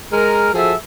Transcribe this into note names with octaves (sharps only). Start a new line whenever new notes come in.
G#3 G#4 A#4
F3 F#4 G#4 A4 E5